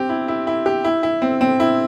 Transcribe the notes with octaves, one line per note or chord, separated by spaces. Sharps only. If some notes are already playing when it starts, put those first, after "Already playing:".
Already playing: C4 G4
E4
E4
E4
G4
E4
E4
C4
C4
E4